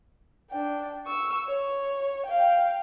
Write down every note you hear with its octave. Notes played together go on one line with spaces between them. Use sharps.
D4 G5
C#6 E6
C#5
F5 G5